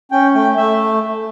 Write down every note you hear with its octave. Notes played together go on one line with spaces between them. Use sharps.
C#4 G5
A3 G5
A3 E5